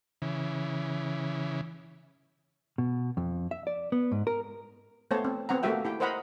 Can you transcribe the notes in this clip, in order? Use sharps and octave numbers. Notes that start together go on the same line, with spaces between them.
C#3 E3
B2
F2
E5
D5
B3
G#2
A#4
A3 B3 C5 C#5 A5
C4
B3 C4 F#5 A#5
A3 A#3 F#4 G4 E5 G5
E4 G4 G5
A#4 C5 D#5 F#5 A#5 B5